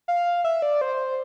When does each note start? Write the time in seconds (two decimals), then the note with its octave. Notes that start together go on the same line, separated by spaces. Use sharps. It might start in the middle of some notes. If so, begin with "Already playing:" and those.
0.08 F5
0.44 E5
0.62 D5
0.81 C5